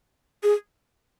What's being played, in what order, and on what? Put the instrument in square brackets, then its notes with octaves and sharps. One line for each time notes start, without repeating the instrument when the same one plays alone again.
[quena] G#4